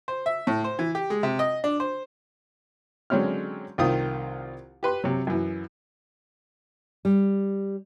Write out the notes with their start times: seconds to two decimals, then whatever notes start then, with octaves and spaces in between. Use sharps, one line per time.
0.08 C5
0.26 E5
0.47 A2
0.64 C5
0.79 E3
0.95 G4
1.10 G#3
1.23 C3
1.39 D#5
1.64 D4
1.80 C5
3.10 D3 F#3 G#3 C4 C#4 F6
3.78 C2 D#3 C4 F4 D#6
4.83 G4 B4 C6
5.04 C3 F#3
5.27 F#2 E3
7.05 G3